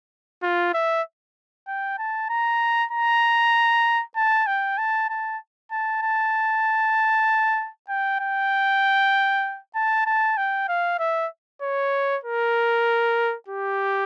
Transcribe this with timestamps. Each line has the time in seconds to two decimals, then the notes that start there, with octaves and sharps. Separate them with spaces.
0.43 F4
0.74 E5
1.68 G5
1.99 A5
2.30 A#5
2.91 A#5
4.16 A5
4.47 G5
4.78 A5
5.10 A5
5.71 A5
6.03 A5
7.89 G5
8.20 G5
9.75 A5
10.06 A5
10.37 G5
10.69 F5
11.00 E5
11.62 C#5
12.24 A#4
13.48 G4